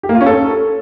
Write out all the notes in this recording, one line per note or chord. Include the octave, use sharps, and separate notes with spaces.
G4
A#3
F4
C#4
A4